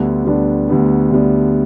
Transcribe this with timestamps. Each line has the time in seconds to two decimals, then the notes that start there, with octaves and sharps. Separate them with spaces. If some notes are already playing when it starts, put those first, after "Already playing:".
Already playing: D2 D3 G3 B3 D4
0.25 D2 D3 G3 B3 D4
0.68 D2 D3 G3 B3 D4
1.11 D2 D3 G3 B3 D4